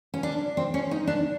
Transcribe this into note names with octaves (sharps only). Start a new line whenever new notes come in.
C#4
D4
C4
C#4
D#4
D4